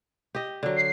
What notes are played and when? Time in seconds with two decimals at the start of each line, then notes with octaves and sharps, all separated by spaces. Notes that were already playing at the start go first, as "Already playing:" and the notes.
0.35 G4 D#5
0.63 D3 F#3
0.76 C7